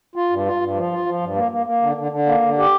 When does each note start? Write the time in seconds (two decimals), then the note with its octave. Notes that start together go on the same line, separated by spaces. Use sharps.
0.16 F4
0.30 G2
0.46 F4
0.61 G2
0.76 F3
0.91 F4
1.06 F3
1.21 G2
1.36 A#3
1.51 A#3
1.66 A#3
1.82 D3
1.97 D3
2.12 D3
2.27 A#3
2.42 D3
2.58 G4